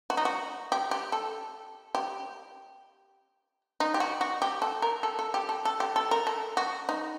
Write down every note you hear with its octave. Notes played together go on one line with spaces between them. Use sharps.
F#4
D#4
F#4
G4
G4
A4
G4
D#4
G4
F#4
F#4
G4
A4
A#4
A4
A4
G4
A4
A4
G4
A4
A#4
A4
F#4
D#4